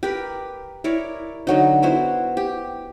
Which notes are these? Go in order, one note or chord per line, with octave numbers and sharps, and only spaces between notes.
G4 A#4 B4
E4 A#4 C#5 D5
D3 F#3 D#4
B3 E4 F#4 C5
G4